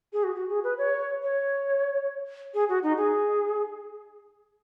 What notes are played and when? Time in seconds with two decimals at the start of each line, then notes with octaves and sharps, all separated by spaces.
0.13 G#4
0.24 F#4
0.35 F#4
0.49 G#4
0.64 B4
0.78 C#5
1.23 C#5
2.54 G#4
2.69 F#4
2.83 D#4
2.97 G#4